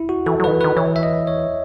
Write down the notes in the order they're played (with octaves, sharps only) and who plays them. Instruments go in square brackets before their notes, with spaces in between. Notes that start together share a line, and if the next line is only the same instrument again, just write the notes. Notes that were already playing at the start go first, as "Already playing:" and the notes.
Already playing: [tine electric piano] E4
F#4
[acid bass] E3 [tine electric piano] A4
[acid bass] F#3
[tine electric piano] B4
[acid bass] D#3
E3
[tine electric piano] B4
[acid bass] D#3
[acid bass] E3 [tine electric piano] C#5
[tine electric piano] E5
D#5
C#5